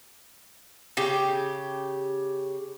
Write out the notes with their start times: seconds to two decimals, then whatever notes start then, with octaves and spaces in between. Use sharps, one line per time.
0.97 C#3 G4